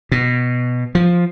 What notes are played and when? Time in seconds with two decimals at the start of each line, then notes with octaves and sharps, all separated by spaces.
0.12 B2
0.95 F3